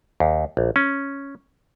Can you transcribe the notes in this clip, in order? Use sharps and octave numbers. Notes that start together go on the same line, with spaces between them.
D#2
A#1
C#4